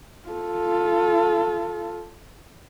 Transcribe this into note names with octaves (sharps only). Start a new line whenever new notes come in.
F4 A4